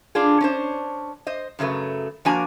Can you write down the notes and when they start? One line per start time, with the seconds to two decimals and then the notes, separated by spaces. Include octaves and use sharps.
0.15 D4 F4 G#4
0.41 C#4 D4 C5
1.27 C5 D#5
1.59 F#2 C#3 F#3 A3 B4
2.25 F3 A#3 D4 F#4 G#5 A#5